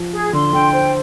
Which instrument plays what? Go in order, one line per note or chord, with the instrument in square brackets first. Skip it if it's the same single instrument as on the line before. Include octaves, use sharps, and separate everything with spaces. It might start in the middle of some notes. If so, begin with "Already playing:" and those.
Already playing: [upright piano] F3
[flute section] G#4
[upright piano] D3 [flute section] C6
[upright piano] D3 [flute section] G5
[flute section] C5